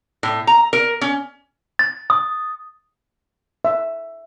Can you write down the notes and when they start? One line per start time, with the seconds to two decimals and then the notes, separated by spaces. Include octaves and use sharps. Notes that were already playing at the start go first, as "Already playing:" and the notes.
0.23 A2
0.47 A#5
0.73 A#4
1.01 C#4
1.79 A6
2.10 D#6
3.65 E5